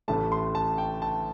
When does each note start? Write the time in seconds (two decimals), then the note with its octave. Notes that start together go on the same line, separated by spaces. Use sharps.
0.08 A1 A2 A3 A5
0.32 C6
0.55 A5
0.78 G5
1.02 A5